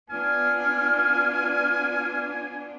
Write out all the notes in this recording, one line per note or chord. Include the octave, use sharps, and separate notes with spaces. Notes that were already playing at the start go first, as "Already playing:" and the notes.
B3 D4 F4 G#5 F6